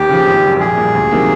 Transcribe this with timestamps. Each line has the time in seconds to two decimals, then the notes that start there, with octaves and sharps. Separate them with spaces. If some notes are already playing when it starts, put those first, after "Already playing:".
Already playing: D#2 G4
0.09 C#3 F3
0.26 G#1
0.43 F#2 C#3
0.60 A#1 G#4
0.77 A#2 G3
0.95 D2
1.11 C3 D#3 F#3 A#3